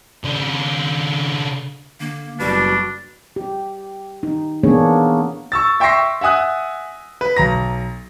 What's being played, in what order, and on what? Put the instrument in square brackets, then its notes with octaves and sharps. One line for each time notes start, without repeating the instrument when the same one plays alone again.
[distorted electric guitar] C#3 D4
[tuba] D3 [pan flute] A#3
[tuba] F#1 [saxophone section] B2 G3 [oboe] D4 [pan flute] F#4
[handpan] G4
D#4
E3 A#3 B3 D4 G#4 C#5
[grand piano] C#6 E6 A6
E5 G5 C6 C#6 A#6 C7
E5 F#5 G#5 D#6 F#6
B4
B1 A#5 A#6